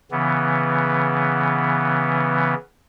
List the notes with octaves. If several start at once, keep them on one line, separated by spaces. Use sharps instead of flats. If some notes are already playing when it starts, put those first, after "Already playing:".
C#3 E3 B3